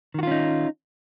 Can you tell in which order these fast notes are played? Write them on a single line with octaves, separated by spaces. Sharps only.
D#3 F#4 F4 C#4 D#4